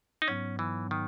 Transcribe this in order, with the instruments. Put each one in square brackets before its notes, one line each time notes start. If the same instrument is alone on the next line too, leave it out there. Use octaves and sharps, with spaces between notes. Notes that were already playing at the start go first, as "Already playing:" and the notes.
[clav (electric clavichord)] D#4
[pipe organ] G#2 F#3 B3 [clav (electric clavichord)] C#4
[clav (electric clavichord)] E3
D#3